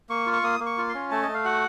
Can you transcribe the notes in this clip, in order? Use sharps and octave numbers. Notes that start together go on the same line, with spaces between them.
A#3 C#6
F4
C#6
A#3 D#6
A#3
C#6
F4
C6
C#4
A3 A5
D#5
A3
F5
F#4 F#5